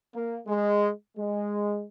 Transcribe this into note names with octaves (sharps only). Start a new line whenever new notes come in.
A#3
G#3
G#3